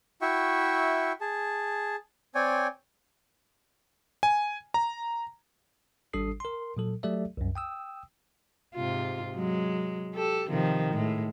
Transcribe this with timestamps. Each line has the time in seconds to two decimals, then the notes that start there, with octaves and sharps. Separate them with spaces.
0.21 E4 F#4 E5 G5 C#6
1.21 G#4 A5
2.35 C4 C#5 D5 G5 G#5
4.23 G#5
4.74 A#5
6.13 G#1 G3 D4 A4 D#6 C7
6.40 A#4 C6
6.77 A#2 F#3 A4
7.03 F#3 A3 G4 A4 D5 E5
7.37 C2 F#2
7.55 G5 D#6 E6
8.75 G#2 C3 F4
9.35 F#3 G#3
10.14 G4 A4
10.48 C3 D#3 F3
10.93 A2 G#3